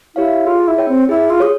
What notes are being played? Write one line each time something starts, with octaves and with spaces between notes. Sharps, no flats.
E4 G4 C#5 F5
F4 G#4
E4
C#5 G5
C4
E4 G#4
F4
G#4 C#5